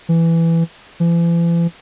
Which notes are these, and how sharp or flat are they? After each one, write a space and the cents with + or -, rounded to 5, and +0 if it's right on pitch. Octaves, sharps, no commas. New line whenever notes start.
E3 +10
E3 +45